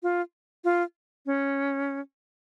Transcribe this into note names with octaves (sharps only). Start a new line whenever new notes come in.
F4
F4
C#4